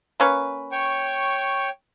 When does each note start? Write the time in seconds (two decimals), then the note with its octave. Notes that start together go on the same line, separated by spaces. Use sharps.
0.20 A#3 C#4 B4
0.72 C#5 G5 C#6